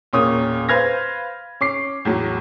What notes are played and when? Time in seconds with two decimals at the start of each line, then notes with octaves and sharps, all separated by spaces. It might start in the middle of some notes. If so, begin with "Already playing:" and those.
0.13 E1 A#2 C#4 D#6
0.69 B4 C5 F5 F6 G#6 A#6
1.61 C#4 D6 C7
2.05 E2 A2 F#3